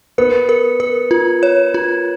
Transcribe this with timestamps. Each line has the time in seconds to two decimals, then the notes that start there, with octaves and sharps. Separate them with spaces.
0.18 B3 A#4
0.49 A#4
0.80 A#4
1.11 F4
1.43 C#5
1.74 F4